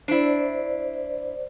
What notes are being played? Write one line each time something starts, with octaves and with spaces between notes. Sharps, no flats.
D4 E4 C5 D5